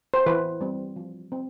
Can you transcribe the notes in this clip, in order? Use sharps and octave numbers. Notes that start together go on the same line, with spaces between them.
C5
E3 B4
G3 C4
F3
C4